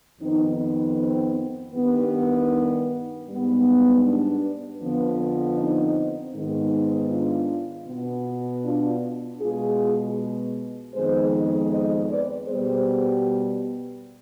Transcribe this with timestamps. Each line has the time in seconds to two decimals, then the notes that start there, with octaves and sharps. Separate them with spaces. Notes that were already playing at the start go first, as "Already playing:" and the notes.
0.20 F2 D#3 B3 C4 D#4
0.97 C4
1.73 G2 D#3 G3 B3
3.27 G#2 G3 B3
4.03 B3 D4
4.81 F2 D3 F3 B3
5.58 C4 D#4
6.35 G#2 D#3 B3
7.10 D4 F4
7.87 B2 B3
8.64 D4 F4
9.41 B2 G#3 B3 F4 G#4
10.94 F2 D#3 G#3 B3 G#4 C5
11.70 C5 D#5
12.09 B4 D5
12.47 B2 G3 B3 G#4 C5